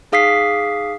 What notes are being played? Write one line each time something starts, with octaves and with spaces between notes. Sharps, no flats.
D#4 G#4 F5 D#6 B6 C7